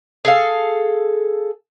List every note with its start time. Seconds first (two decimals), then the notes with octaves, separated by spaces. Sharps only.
0.25 G#4 A4 F5